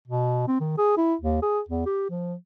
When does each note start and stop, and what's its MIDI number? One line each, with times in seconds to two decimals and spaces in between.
0.08 0.47 47
0.48 0.60 60
0.60 0.75 51
0.78 0.97 68
0.97 1.14 64
1.21 1.40 39
1.42 1.60 68
1.69 1.84 40
1.86 2.06 67
2.10 2.34 53